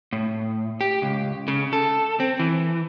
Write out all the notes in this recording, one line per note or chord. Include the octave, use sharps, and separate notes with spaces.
A2
G4
C#2
C#3
A4
C4
E3